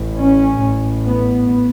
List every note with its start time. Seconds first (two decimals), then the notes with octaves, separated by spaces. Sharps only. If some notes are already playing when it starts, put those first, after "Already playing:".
Already playing: A1 A2
0.20 C#4
0.63 A1 A2
1.06 B3